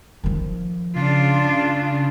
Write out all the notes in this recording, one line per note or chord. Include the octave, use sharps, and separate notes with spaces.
D#3 F3
C#3 D4 F4